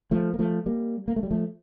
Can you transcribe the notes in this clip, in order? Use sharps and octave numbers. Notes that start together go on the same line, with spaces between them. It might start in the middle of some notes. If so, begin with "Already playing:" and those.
F3 A3
A#3
F3 A3
G3 A#3
A#3
A3
G3
F3 A3